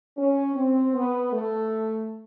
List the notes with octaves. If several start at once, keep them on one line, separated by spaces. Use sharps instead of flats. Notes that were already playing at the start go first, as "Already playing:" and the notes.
C#4
C4
B3
A3